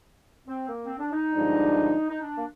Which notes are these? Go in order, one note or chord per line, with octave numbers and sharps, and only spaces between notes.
C4
A#3
C4
D4
D#4
G2 D3 F3 G#3 D4
D#4
D4
A#3